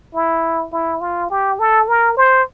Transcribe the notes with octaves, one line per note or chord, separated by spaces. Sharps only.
E4
E4
F4
G4
A4
A#4
C5